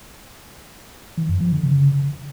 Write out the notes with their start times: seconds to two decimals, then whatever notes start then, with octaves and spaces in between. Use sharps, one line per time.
1.17 E3
1.29 F#2
1.40 F3
1.52 D3
1.63 C#3